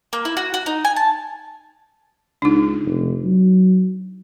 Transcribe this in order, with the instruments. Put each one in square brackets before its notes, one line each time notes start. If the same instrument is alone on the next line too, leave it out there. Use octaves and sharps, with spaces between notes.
[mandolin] A#3
E4
F#4
F#4
D#4
G#5
A5
[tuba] C#2 [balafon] D4 D#4
[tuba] F1
F#3